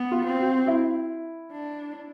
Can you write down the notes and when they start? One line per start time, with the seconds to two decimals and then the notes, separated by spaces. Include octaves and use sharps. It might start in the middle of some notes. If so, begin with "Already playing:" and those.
Already playing: B3
0.11 F4
0.26 C4
0.40 F#4
0.67 E4
1.51 D4